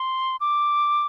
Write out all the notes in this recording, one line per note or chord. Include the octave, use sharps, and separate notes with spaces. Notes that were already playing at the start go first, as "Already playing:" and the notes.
Already playing: C6
D6